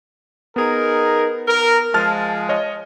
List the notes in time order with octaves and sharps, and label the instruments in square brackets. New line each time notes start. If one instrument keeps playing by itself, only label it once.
[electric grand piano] B3 [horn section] D#4 G#4 A#4
[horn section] A#4
[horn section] F3 G#3 [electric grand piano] A5 F6 A6
[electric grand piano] C#5 D#5